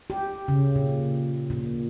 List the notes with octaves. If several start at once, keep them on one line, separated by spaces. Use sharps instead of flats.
G4
C#3
A#2
A#2